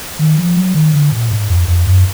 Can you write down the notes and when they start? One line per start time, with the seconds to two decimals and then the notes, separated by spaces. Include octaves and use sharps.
0.19 D#3
0.38 F3
0.56 F#3
0.74 D#3
0.93 D3
1.12 A#2
1.31 G#2
1.50 F2
1.68 F2
1.87 F#2